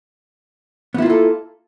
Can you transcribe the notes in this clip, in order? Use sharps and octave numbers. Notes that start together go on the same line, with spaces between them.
A#3 B3 E4 F4 A4